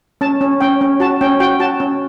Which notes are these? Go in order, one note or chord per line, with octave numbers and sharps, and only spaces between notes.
C#4 A5
C#4
C#4 G5
C#4
F#4 A5
C#4 G5
F#4 G5
F#4 A5
C#4